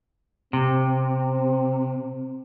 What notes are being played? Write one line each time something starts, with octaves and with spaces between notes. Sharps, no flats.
C3 C4